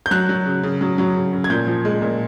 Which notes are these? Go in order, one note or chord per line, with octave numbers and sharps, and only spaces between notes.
G6
F#3 F#6
F#3
C#3
C#3
F#3
F#3
C#3
C#3
G#6
A#2 G6
F3
G#3
A#2